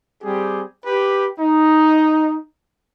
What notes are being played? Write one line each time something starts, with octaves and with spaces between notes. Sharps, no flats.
G3 C4 G4 G#4
G4 B4
D#4